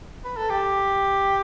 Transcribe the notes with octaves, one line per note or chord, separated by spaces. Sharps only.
B4
A4
G4